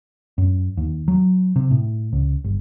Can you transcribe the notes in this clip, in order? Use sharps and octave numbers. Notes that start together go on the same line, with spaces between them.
F#2
D#2
F#3
C3
A2
C#2
G1